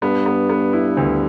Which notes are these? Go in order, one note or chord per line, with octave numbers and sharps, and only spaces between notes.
G2 B3
B3
B3
E4
D2